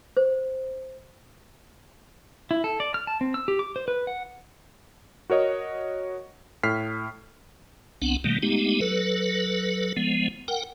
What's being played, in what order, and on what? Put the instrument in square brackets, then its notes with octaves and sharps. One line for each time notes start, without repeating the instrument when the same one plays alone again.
[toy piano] C5
[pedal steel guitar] E4
A4
D5
F6
A5
C4
E6
G4
D6
C5
B4
F#5
[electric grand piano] F#4 A#4 C#5 D#5
A2 F6 B6 C7
[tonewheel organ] C2 B3 C4 D4 F#5
B2 D#3 G3 A3 A#3
G#3 A3 B3 D#4 G4
F#3 A4 B4
F3 G#3 B3
A#4 F#5 G5